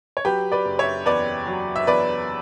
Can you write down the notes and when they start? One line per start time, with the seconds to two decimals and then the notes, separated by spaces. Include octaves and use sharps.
0.17 C#5
0.25 F#3 G4 B4
0.52 B4 D5
0.65 F#1
0.79 C#5 E5
1.06 E2 B4 D5
1.47 F#3
1.76 E5
1.87 E2 B4 D5